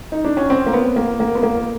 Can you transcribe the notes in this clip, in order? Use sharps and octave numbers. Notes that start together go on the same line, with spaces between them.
D#4
D4
C#4
C4
A#3
B3
A#3
A#3
B3
A#3